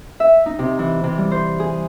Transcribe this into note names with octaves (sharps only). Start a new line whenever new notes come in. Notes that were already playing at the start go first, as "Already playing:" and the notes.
E5
D#4
C3
E3
C3
G3
C5
G#4